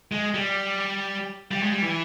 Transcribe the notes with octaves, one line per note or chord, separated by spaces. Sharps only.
G#3
G3
G3
G#3
G3
E3